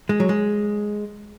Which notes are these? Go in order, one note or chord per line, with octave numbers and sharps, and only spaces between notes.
G#3
F#3
G#3